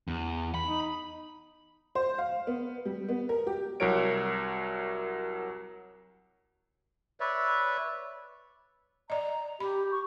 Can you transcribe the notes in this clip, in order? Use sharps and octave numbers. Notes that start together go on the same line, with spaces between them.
E2
B5
D#4
C5
F5
B3
G3
B3
A#4
G4
C2 F#3 F#4 A#4 C#5 D7
B4 C#5 D5 E5
D5 D#5 A#5
G4 B5
C#6